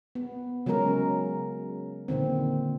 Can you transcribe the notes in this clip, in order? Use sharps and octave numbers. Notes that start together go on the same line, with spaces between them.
B3
C#3 F#3 G#3 C#4 A#4
A#2 D3 D#3 C4